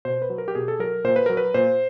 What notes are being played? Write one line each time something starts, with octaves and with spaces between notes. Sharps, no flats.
B2 C5
B4
F#3
A#4
G4
B2 G#4
A4
F#3 A#4
A#2 C5
B4
F#3 A#4
B4
A#2 C5